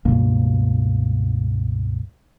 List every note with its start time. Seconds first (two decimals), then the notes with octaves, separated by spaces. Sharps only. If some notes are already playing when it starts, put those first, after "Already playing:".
0.05 C#2 G2 B2 A#3